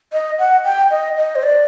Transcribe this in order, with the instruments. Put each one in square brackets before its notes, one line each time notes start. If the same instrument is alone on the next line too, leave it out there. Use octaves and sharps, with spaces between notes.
[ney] D#5
F#5
G5
D#5
D#5
C5
D5